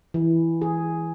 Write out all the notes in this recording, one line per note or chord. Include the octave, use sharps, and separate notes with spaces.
E3
G#4